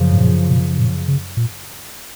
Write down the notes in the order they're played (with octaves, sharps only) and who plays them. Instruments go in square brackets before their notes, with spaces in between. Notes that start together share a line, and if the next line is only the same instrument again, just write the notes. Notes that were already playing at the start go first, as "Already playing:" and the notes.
Already playing: [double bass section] F#2 C#3 F3
[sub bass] G#2
A#2
B2
A#2
C#3
A#2